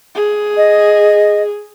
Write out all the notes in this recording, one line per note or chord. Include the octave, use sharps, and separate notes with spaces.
G#4
D#5